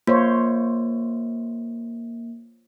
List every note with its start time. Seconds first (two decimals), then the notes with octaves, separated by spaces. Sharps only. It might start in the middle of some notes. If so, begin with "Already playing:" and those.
0.07 A#3 F4 C5 C#5